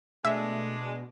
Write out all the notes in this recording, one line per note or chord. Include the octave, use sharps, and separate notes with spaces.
B2 G#3 A3 D4 E5